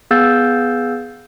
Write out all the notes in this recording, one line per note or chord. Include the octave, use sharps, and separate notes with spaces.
B3 G#4 F5 E6 G6 A6